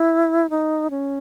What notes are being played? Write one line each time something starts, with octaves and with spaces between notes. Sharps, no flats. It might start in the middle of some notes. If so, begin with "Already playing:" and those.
Already playing: E4
D#4
C#4